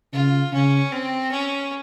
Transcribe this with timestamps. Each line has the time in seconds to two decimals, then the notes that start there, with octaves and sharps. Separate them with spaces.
0.13 C#3 F4
0.52 C#3 C#4
0.92 C4
1.31 C#4